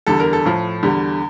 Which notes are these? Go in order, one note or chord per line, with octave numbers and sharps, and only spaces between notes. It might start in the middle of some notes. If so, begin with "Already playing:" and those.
E2 D3 G3 A4
A#4
A4
A2 F3
E2 D3 G3